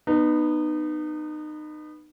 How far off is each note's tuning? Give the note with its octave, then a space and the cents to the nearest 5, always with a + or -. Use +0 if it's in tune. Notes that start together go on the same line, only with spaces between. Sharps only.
B3 +0 D#4 -30